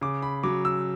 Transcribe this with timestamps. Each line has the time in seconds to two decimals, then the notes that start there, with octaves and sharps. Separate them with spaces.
0.01 C#3 D6
0.22 B5
0.43 F#3 D6
0.65 E6